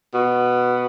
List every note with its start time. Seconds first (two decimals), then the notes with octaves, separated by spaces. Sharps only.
0.14 B2